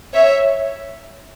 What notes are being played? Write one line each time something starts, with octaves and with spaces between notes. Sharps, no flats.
C#5 E5